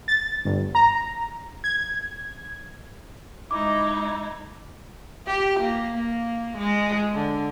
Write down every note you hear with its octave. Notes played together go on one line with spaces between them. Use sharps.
A6
G1
A#5
G#6
G#3 D#4 E4 D6
G4
A#3
A#3
G#3
D3